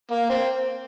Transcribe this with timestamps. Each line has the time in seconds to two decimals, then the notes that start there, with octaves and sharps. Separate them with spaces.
0.11 A#3
0.29 C4